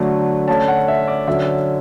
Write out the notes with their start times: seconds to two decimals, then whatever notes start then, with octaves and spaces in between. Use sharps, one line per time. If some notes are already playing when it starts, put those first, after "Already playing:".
Already playing: D3 F#3 A3
0.48 D3 A3 C#4 A5
0.68 F#5
0.88 E5
1.08 D5
1.28 D3 F#3 C#4 E5